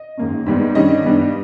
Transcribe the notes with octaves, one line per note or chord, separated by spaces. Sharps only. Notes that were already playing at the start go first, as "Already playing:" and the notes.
Already playing: D#5
G#2 D#3 A#3 C#4
G#2 G3 B3
G2 D#3 G3 C#4 D#5
G2 G3 B3